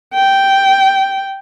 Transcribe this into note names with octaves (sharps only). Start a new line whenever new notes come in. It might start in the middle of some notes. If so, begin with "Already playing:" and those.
G5